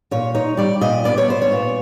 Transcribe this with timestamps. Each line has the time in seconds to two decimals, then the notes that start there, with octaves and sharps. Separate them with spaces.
0.11 A#2 C#5
0.34 D#4 C#5
0.57 G3 D5
0.81 A#2 D#5
1.04 B3 D5
1.18 C#5
1.28 B3 C5
1.42 C#5
1.52 A#2